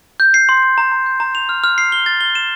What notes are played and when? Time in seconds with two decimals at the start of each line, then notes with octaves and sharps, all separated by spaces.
0.20 G6
0.34 C7
0.49 C6
0.63 C7
0.78 A#5
0.92 A#5
1.06 G6
1.20 A#5
1.35 F7
1.49 F6
1.64 F6
1.78 C7
1.92 G7
2.06 A6
2.21 G7
2.35 E7